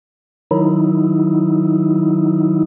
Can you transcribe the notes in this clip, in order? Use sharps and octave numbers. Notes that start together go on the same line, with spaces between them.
D#3 F#3 D#4 E4